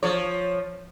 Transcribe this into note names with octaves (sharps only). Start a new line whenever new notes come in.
F3 C#5